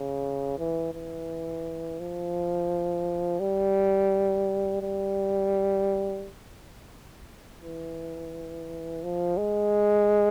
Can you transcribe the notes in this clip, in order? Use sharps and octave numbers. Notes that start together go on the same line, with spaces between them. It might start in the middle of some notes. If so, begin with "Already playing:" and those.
Already playing: C#3
E3
E3
F3
G3
G3
E3
F3
G#3